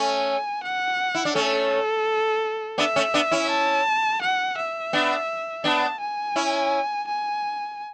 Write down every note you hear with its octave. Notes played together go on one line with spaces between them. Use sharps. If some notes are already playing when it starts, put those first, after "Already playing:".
Already playing: A3 C#4 G#5
F#5
E4
D4
A3 C#4 A4
B3 D4 E5
A3 C#4
B3 D4
C#4 E4
A5
F#5
E5
B3 D4
B3 D4 A5
G#5
C#4 E4
G#5